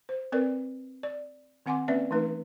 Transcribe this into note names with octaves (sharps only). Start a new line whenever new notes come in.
C5
C4 A#4 B4 D5
D5
D#3 C4 F#5 G#5 C6 D6
A#3 C4 C#4 B4 D5 E5
E3 A3 D#4 B4